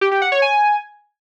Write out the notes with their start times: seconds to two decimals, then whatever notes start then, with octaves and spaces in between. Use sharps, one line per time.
0.01 G4
0.11 G4
0.22 F#5
0.32 C#5
0.42 G#5